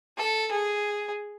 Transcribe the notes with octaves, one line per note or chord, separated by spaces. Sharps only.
A4
G#4